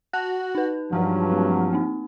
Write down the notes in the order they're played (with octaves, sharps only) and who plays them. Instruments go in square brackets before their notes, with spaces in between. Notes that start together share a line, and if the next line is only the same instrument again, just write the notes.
[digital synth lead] F#4 [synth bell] A5 F#6
[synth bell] D#4 B4
[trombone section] G2 F#3 [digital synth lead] F3
[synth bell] A3 C4
A#3 C4 D#4